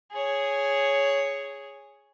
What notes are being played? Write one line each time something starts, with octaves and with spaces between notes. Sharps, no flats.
G#4 C#5